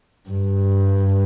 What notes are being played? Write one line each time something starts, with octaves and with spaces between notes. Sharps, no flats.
G2